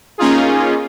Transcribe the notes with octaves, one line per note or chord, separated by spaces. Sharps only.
A#3 C#4 D#4 F4 G#4